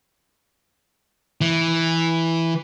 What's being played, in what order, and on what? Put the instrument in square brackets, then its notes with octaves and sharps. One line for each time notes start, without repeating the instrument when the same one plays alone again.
[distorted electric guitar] E3